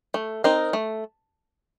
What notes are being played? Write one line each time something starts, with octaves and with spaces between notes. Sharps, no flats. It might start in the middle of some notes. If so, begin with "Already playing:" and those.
A3
C4 D#4 A#4
A3